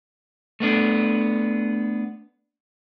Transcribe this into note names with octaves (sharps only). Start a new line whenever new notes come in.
A3 B3 D4